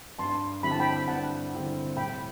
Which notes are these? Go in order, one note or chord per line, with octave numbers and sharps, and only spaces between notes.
G2 A5 C6
D3 G3 C4 E4 B5
A5
G5 B5
G2 F#5 A5
D3 G3 C4 E4
A2 G5 B5